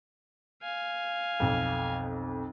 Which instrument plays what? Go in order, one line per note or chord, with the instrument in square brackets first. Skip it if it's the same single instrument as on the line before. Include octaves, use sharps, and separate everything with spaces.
[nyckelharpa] F5 G#5
[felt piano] B1 F2